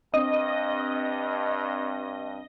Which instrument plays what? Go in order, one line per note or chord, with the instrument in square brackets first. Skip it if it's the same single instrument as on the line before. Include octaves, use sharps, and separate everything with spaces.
[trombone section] G2 [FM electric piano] C4 D4 [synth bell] D#5